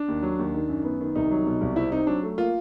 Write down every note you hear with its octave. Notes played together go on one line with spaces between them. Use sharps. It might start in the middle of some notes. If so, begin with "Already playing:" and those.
Already playing: D4
D#2
F#3
D#2
D#3
F#2
B3
D#3
C2 D#4
F#3
B2
C2
C4 E4
C4 D#4
F#3 D4
A3
A#3 F4